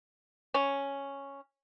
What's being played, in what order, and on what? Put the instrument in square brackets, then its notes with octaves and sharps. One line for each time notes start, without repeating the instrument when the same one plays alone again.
[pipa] C#4